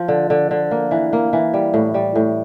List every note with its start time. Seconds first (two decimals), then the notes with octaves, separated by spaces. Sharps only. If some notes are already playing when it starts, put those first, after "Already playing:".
Already playing: F3
0.08 D3
0.30 D3
0.51 D3
0.71 A#3
0.91 E3
1.13 A#3
1.33 E3
1.54 G3
1.74 A2
1.94 G3
2.16 A2